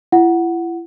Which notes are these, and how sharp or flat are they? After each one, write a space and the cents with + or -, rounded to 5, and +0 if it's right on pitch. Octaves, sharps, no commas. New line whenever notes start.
E4 +35 F#5 +0